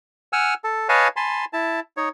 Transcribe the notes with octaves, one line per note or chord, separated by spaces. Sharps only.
F#5 G#5 E6 F6
A4
B4 C#5 D#5 F5 G#5 A5
G#5 A5 B5 C6
E4 A5
D#4 C#5